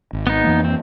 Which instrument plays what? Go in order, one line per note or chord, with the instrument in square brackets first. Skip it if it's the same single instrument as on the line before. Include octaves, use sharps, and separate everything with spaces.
[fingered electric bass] G#1
[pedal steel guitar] B3 D#4
[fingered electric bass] F2 E3 A#3
[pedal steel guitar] C4